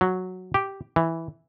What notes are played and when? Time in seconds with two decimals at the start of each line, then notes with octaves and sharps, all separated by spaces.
0.01 F#3
0.54 G4
0.96 E3